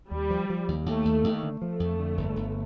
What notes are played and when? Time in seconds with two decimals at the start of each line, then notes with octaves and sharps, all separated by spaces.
0.11 D#2 G3
0.30 F3
0.50 F3
0.68 D#2
0.86 D#2 A3
1.05 D#2
1.24 D#2
1.43 D3
1.61 F3 A3
1.80 F2
1.99 D3
2.17 G1
2.36 G1